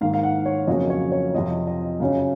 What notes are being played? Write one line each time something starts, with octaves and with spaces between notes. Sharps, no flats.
G#2 D#3 A#3 F5
F5
F#5
C#5
F2 C#3 F#3 A#3 C#4 D#5
C#5
C#5
F2 C3 F3 D#5
D#5
F#2 C#3 F#3 C#4 F5